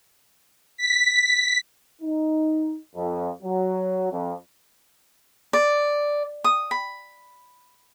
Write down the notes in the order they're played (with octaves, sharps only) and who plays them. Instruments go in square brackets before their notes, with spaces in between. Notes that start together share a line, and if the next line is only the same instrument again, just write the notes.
[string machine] B6
[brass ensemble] D#4
F2
F#3
F2
[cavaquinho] D5
D#6
B5